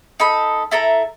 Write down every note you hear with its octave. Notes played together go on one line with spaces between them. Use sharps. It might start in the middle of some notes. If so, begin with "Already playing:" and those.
D#4 A4 B5
E4 A4 E5 A#5